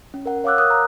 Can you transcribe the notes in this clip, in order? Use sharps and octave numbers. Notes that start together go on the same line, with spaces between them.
C#4
A#4 F#5
C#5 F5 F#5 D6 E6 F#6
A#4 D#6 F#6
A#5